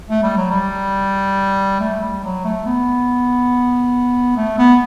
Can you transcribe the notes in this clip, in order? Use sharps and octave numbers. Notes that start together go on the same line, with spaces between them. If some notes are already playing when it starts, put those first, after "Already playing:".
A3
G3
F#3
G3
A3
G3
F#3
A3
B3
A3
B3